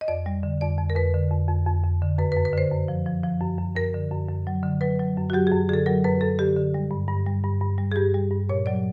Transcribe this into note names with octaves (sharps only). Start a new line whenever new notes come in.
D#5
F2 D5
G3
D3
F2 D5
F2
A#4
F2 B4
D3
F2
F2
F2
F2
D3
F#2 B4
B4
F#2
B4
D3 C5
F#2
F3
F3
F3
F#2
F#2
F#2 A#4
D3
F#2
F#2
F#3
D3
F#3 B4
F#3
F#2
F#4
F#3 G4
F#2 G#4
D3 G#4 A4
F#3 A#4
F#2 B4
F#2 A4
D3 G4
D3
G3
G2
G2
G3
G2
G2
G3
G#4
G2 G4
G3
G2
A#2 C#5
F#3 D5